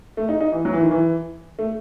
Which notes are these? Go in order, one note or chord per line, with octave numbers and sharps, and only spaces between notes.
A3
D#4
D#4
E3
F#3
E3
D#3
E3
A3